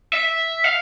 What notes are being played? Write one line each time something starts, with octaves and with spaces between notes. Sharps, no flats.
E5
F5